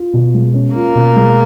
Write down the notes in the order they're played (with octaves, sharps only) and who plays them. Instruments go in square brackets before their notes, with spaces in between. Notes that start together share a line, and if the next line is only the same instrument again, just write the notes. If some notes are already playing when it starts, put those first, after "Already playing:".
Already playing: [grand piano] F4
B2
G#3
C#4
[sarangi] A#3 [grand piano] F4
[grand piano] B2
G#3